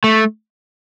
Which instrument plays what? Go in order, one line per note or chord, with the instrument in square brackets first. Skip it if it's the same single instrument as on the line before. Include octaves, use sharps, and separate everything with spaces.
[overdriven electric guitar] A3